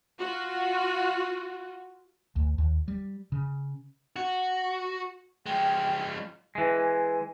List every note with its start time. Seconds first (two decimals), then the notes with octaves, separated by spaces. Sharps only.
0.20 F4 F#4
2.36 D2
2.58 D#2
2.88 G3
3.32 C#3
4.16 F#4
5.46 F3 G#3 G5
6.55 E3 G#3